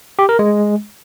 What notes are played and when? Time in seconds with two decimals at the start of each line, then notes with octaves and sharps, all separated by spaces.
0.19 G4
0.29 A#4
0.39 G#3